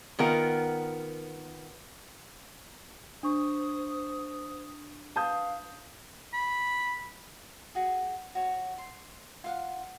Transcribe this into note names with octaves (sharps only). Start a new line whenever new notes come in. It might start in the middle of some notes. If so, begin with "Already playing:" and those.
D#3 B3 F4 A#4
D4 C5 C#6 D#6
B4 F5 A5 D#6 G6
B5
F#4 G#4
F#4 C#5
C6
F4 F5 F#5